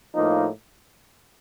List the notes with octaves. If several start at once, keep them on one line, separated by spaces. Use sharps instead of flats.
A2 F3 A#3 D#4